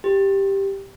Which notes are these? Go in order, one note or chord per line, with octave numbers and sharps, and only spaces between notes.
G4